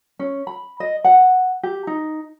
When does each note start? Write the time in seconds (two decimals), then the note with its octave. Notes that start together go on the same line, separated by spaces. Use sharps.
0.19 C#4
0.47 B5
0.80 D#5
1.04 F#5
1.63 G4
1.87 D#4